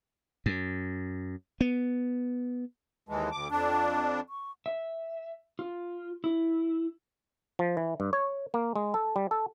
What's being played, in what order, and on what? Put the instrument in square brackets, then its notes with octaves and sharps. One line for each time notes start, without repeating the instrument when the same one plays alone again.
[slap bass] F#2
B3
[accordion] D#2 E3 G#3 [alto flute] A5
[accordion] D2 D6
[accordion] F2 D4 [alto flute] A5
[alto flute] C#6
[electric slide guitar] E5
F4
E4
[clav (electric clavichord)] F3
E3
G2
C#5
A#3
G#3
A4
G3
A4